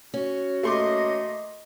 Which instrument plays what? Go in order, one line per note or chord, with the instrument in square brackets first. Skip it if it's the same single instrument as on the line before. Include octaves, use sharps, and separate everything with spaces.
[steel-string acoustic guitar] C#4 [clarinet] F#4
[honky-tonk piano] A3 C6 D6 [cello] A#3 D#5